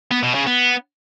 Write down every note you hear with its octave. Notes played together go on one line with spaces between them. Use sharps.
B3
B2
C#3
B3